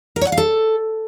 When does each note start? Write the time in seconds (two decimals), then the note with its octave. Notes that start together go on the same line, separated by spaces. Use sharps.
0.16 A#4
0.21 C#5
0.27 F#5
0.32 F5
0.37 A4